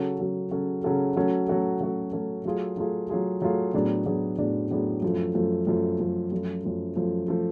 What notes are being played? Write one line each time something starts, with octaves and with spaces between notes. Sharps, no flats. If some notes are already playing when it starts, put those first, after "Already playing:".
Already playing: C#3 F#3 C#4 F#4 A4
C#3 F#3 C#4 F#4 A4
C#3 F#3 C#4 F#4 A4
C#3 F#3 C#4 F#4 A4
F#3 A3 C#4 F#4 A4
F#3 A3 C#4 F#4 A4
F#3 A3 C#4 F#4 A4
F#3 A3 C#4 F#4 A4
F#3 A3 F4 G#4
F#3 A3 F4 G#4
F#3 A3 F4 G#4
F#3 A3 F4 G#4
A2 F#3 B3 D4 G#4
A2 F#3 B3 D4 G#4
A2 F#3 B3 D4 G#4
A2 F#3 B3 D4 G#4
F#2 F3 A3
F#2 F3 A3
F#2 F3 A3
F#2 F3 A3
F#2 F3 A3
F#2 F3 A3
F#2 F3 A3
F3 A3